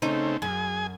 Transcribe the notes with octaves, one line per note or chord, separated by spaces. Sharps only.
C#3 A3 C4 D#4
F#2 G#4 G#5